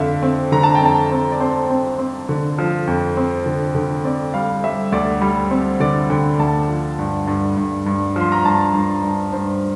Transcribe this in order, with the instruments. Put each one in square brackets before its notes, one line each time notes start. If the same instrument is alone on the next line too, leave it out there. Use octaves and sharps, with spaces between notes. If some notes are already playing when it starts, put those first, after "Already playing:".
Already playing: [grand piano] F2 D3 E5 F5
C4
D3 A#5
A5
G5
F2 A5
C4
D5
C4 C5
C4
C4
D3
F3
F2
C4
D3
D3
C4 D5
G3 F5
G3 E5
D2 D5
G3
C4
D3 D5
D3 G5
D2 A5
F3
G2
G2
G2
G2
F3 C6
A#5
G2 A5
G2
G2
G2 C5